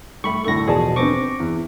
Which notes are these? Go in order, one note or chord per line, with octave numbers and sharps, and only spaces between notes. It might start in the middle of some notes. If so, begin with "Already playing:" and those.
G3 A3 B5 C#6
D2 A2 A4 C#6 A#6
E2 B2 F3 G#4 D5 A5
B3 C4 D4 C#6 D6 A#6
E2